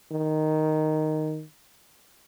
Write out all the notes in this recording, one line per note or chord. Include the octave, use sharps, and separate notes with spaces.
D#3